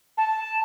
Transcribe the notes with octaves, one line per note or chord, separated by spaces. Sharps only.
A5